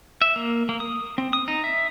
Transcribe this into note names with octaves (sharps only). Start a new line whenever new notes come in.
E5
A#3
A#3
D#6
C4
D#6
D#4
E5